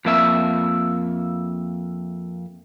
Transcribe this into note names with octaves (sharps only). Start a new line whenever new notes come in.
F2 A#3 E5